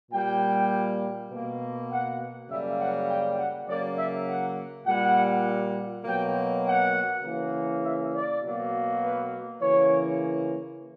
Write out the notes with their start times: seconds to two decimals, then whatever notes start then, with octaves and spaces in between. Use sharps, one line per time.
0.10 A#2 G3 A#3 G5
1.29 B2 A#3
1.90 F#5
2.48 F#2 C#3 G3 A#3 E5
2.79 F#5
3.08 G5
3.37 F#5
3.67 C#3 F#3 A#3 D5
3.96 E5
4.26 F#5
4.86 A#2 G3 A#3 F#5
6.04 B2 F#3 A#3 G5
6.64 F#5
7.23 C#3 E3 A#3
7.83 E5
8.13 D5
8.42 B2 F#3 A#3
9.01 B4
9.60 C#3 E3 A#3 C#5